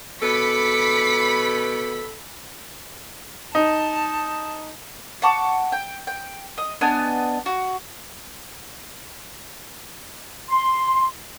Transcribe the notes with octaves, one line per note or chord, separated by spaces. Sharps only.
B2 A4 B5 D6 B6 C#7
D#4 A5
F#5 A5 C#6 D6
G5
G5
D#5
B3 D4 D#5 G#5
F#4
C6